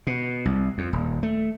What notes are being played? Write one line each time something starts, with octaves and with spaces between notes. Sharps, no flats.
B2
C2
F2
D#1
A3